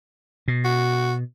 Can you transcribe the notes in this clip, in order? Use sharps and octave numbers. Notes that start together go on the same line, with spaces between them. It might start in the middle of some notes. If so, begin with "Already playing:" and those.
B2
F#4